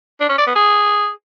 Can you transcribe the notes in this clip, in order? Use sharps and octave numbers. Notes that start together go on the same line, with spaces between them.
D4
C#4
D5
B3
G#4